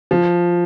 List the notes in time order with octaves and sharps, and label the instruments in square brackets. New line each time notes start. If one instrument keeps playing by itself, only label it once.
[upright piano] F3